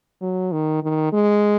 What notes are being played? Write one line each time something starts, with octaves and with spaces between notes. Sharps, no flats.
F#3
D#3
D#3
G#3